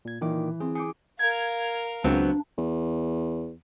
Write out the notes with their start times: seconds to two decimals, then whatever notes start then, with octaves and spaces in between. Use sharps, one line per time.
0.05 A#2 G#6
0.21 A#2 D#3 E3 D6
0.60 C4 G#4
0.75 G#4 D6 G6 C#7
1.19 A#4 F5 G#6
2.04 C#2 F#3 B3 C4 D4
2.58 E2